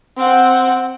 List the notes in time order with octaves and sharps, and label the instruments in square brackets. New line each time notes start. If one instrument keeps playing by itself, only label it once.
[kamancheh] C4 F#5